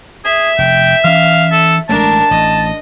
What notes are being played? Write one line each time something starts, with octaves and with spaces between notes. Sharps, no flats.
G#4 E5
F1 G5
E3 C#4 F5
A4
A1 G#3 A3 D4 A#4 A5
A1 D#5